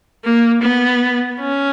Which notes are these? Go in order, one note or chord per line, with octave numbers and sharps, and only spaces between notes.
A#3
B3
C#4